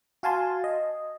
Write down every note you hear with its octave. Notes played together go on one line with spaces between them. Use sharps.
F#4 F5 G#5 A5 C6
D#5